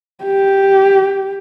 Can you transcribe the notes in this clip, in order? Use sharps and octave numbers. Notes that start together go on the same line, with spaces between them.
G4